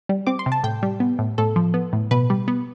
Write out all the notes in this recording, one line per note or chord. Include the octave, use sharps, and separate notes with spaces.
G3
C4 D6
C6
C3
A5
A2 G5
G3
B3
A2
A2 A4
F3
B3
A2
B2 B4
G3
B3